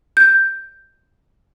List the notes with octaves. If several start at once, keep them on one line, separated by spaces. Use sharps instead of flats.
G6